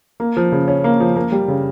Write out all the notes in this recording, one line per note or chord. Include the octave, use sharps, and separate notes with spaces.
A#3
F3
C#3
C#4
A#3
F3
A#3
G3
C#3